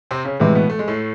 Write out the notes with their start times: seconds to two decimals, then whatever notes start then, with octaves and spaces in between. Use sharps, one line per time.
0.11 C3 C4
0.25 C#3 C#4
0.40 A2 C3 E3 G#3 C4
0.55 B2 B3
0.70 A3
0.79 G#3
0.88 A2 A3